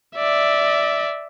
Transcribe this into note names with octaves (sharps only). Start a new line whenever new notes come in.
D5 E5